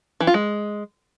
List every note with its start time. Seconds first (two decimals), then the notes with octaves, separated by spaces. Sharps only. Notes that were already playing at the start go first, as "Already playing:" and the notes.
0.20 E3
0.27 F4
0.34 G#3